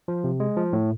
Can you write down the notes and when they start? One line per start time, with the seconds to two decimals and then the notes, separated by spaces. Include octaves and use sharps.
0.08 F3
0.24 C3
0.40 G#3
0.57 F3
0.73 A2